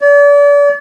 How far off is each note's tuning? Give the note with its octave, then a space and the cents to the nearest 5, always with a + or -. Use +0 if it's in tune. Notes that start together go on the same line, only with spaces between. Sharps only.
D5 -40